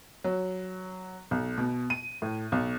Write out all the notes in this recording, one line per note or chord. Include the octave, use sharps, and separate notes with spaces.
F#3
B1
B2
D#7
A2
B1